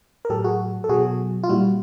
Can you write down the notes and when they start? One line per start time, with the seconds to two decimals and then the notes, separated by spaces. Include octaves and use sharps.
0.25 A#4
0.30 A2 F#3 G4 A4
0.44 F#4 G#4
0.84 A4
0.89 B2 F#3 F#4 G#4
1.43 F4
1.49 A#2 G3 E4 F#4